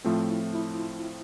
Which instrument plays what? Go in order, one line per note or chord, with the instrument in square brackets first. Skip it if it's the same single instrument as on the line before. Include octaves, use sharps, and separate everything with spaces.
[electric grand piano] A2 F3 A3 C4 [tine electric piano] F4
[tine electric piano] E4
E4